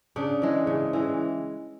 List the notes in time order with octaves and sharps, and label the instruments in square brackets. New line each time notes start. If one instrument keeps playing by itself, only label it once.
[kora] C#3 D4
E3 G#3
C#3
E3 G#3